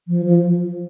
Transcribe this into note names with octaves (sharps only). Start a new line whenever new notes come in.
F3
F3